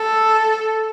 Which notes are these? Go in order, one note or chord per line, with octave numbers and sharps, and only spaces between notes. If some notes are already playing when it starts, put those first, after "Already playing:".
Already playing: A4